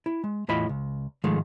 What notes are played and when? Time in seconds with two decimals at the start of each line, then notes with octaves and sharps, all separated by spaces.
0.06 E4
0.24 G#3
0.49 E2 A2 E4 F4 D#5 B5
0.69 C#2
1.24 G#2 D#3 F3 G#3 A3